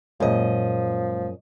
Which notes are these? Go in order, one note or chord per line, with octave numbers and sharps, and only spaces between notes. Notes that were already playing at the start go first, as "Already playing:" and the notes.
F#2 A#2 F3 G#3 D#5